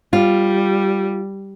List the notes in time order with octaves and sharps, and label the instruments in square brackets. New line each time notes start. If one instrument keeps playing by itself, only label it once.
[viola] G3 [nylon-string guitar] F4